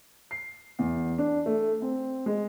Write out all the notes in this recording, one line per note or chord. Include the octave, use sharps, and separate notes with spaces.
C7
E2
D4
A3
C4
G#3